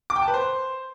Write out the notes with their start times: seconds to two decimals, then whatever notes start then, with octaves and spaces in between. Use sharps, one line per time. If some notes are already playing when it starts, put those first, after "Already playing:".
0.10 D6
0.16 G5
0.22 A5
0.28 B4
0.34 C5